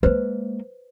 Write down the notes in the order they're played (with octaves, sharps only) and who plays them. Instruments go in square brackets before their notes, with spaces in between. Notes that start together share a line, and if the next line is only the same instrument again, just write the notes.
[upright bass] G#3 A#3 [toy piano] B4 C5